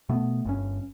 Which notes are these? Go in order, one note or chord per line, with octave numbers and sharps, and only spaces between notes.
B2 A3 B3
G1 G2 C#4